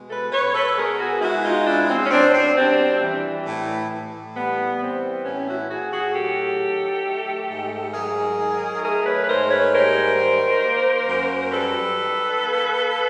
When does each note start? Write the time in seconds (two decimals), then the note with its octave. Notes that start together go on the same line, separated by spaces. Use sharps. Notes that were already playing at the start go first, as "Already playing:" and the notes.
Already playing: B2 G#3
0.10 A4 B4
0.32 B2 B4 C#5
0.54 A4 B4
0.77 B3 G#4 A#4
0.99 F#4 G#4
1.22 G#3 E4 F#4
1.44 D#4 F4
1.66 B2 D4 E4
1.89 C4
2.05 C#4
2.11 B2 C4 D4
2.34 C4 D4
2.56 G3 C4 D4
3.01 E3
3.46 A2
3.91 A2
4.35 G3 B3
4.80 E3 C4
5.25 A2 B3 C#4
5.47 E4 F#4
5.70 A2 F#4 G#4
5.92 F#4 G#4
6.14 F#3 G4 A4
6.59 D#3
7.04 A3
7.49 G#2
7.94 F#3 G#4 A#4
8.39 D#3
8.83 A3 G#4 A#4
9.06 B4 C#5
9.24 B4
9.28 G#2 A#4 C5
9.51 B4 C#5
9.73 G3 A#4 C5
10.17 D#3
10.62 A#3
11.07 F#2
11.52 G3 A4 B4
11.97 D#3
12.42 A#3